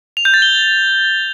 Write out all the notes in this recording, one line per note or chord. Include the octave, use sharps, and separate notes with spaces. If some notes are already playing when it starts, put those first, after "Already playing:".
F7
G6
A6
G7